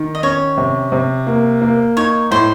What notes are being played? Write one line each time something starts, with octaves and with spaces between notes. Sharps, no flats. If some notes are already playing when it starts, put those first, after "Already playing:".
Already playing: D#3
D#5
C#4 C#5
C3
C3
A#3
A#3
D#4 C#5
A2 C5